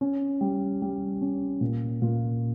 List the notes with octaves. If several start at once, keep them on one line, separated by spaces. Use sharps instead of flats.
C#4
G3
G3
C#4
A#2
A#2